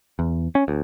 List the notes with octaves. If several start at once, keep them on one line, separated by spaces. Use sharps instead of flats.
E2
C#4
D2